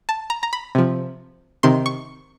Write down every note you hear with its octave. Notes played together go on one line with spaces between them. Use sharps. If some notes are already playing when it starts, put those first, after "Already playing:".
A5
A#5
A#5
B5
C3 F3
C3 D#3 C6
C#6